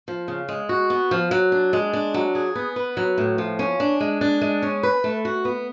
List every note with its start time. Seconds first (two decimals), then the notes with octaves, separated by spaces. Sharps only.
0.08 F3
0.28 C#3
0.49 G#3
0.69 F#4
0.90 B3
1.11 F3
1.31 F#3
1.52 D4
1.73 G#3
1.93 D4
2.14 F#3
2.35 G#4
2.55 B3
2.76 B4
2.97 F#3
3.18 A2
3.38 F3
3.59 C#4
3.80 D4
4.00 G#3
4.21 D4
4.41 G#3
4.63 C#4
4.83 B4
5.04 A3
5.25 F#4
5.45 B3